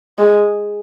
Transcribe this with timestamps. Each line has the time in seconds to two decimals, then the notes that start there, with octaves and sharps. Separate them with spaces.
0.18 G#3